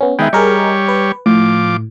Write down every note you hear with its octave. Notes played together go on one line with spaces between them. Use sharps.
B3 C#4
D#3 G#3 B3 E5 G5
G3 G#4 A#4 C#5 D#5
B4
A2 F3 D6